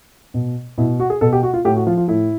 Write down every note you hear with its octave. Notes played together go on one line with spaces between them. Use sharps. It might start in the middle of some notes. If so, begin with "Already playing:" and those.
B2
B2 E4
F#4
G#4
B2 A4
G4
F#4
F4
A2 G4
F#4
F3 F4
F4
A2 E4